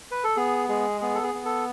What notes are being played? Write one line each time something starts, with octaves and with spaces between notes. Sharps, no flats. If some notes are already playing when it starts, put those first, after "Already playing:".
B4
A4
B3 G#4
G#3 G#4
B3 G#4
A4
G#4
B3
A4